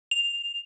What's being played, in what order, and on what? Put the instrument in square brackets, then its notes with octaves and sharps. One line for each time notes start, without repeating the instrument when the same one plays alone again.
[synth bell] F7